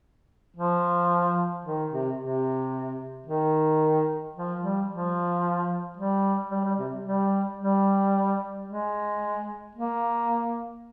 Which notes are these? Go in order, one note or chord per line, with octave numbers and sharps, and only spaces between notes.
F3
D#3
C3
C3
D#3
F3
G3
F3
G3
G3
G3
C3
G3
G3
G#3
A#3